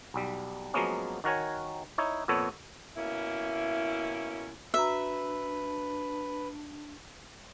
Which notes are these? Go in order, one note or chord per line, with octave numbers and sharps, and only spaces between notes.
B1 G3
F3 F#3 G#3 A#3 B3 C#4
D#3 F#4 A#4 C#5 G#5
D#4 E4 C#5
F2 A#2 B3 A4 C#5
B2 A#3 C#4 E4
D4 F#4 B4 E5 A#5